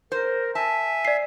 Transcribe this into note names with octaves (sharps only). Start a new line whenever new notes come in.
A#4 C5
E5 G#5 A5
D5 C7